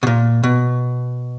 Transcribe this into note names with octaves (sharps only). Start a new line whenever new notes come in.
B2
A#2
B2